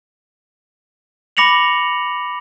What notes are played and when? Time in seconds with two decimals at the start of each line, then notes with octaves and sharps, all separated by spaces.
1.37 B5 D6 A#6 C#7 F7 F#7